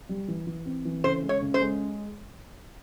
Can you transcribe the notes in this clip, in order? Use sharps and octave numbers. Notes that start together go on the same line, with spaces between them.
G3
E3
E3
C4
E3
C#3 C5
G#3
C#5
C#3
C5
G#3